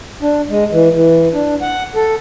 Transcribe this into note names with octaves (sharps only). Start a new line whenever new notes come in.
D4
G#3
E3
E3
D4
F#5
A4